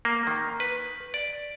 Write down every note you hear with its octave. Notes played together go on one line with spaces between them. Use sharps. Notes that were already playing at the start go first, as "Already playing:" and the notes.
A#3
D#3
B4
D5